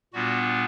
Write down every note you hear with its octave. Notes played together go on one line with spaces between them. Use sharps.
A#2 G3 B3 D4 F#4